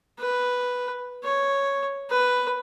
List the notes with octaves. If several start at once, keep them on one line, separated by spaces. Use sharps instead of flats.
B4
C#5
B4